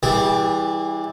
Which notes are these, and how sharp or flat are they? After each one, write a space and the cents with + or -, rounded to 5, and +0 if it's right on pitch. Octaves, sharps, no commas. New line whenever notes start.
E3 -25 G3 +0 G#4 -25